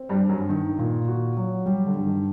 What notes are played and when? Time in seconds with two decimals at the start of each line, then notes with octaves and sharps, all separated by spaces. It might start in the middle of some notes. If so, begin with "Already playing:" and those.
Already playing: C4
0.09 G2 G3
0.20 G2
0.29 F#2 F#3
0.49 D#3 D#4
0.79 A#2
1.08 F#4
1.37 F#3
1.66 G3
1.86 D3
1.96 G2
2.06 D#3